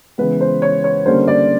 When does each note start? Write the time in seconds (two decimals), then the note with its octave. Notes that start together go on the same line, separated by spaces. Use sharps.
0.18 C#3 E3 G#3 B3 B4
0.41 C5
0.62 C#5
0.84 C#5
1.06 D3 G3 A#3 C#4 C5
1.28 D5